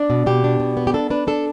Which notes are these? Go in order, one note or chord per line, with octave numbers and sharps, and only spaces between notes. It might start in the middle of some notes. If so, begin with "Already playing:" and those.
Already playing: D4 D5
B2
B2 G4
D4
B2
B3
G4
D4 A4
D4 B4
D4 A4